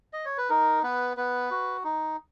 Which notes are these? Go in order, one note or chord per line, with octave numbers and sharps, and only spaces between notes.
D#5
C#5
B4
D#4 A#4
B3 B4
B3 B4
F#4
D#4